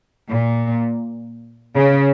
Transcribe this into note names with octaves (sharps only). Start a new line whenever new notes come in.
A#2
C#3